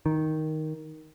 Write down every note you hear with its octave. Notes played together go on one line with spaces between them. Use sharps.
D#3